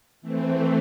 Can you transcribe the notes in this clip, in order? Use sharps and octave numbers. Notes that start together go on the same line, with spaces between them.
E3 A3 C4